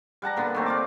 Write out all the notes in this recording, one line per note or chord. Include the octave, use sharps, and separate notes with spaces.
G3 F#5 A5 A#5
A#2 D3 B3
D#3 A3 C4
F4 D5 D6